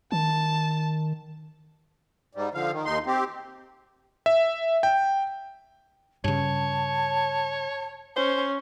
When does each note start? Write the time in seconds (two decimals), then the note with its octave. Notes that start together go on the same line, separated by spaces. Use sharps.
0.12 D#3 A5
2.35 G#2 G3
2.54 D3 F3 F5
2.72 D#3
2.86 D#2 D#4 C6
3.06 C4 G4
4.26 E5
4.83 G5
6.24 G2 C#3 C#5 A5
8.16 C#4 C5